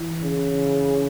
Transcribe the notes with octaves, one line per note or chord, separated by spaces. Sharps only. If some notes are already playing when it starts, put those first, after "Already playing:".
Already playing: E3
C#3